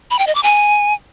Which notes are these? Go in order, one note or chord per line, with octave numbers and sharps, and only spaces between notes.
B5
G5
D#5
D6
G#5